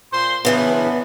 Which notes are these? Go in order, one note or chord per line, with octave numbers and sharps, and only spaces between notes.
A#2 C5 C6
C#3 E3 B3 D4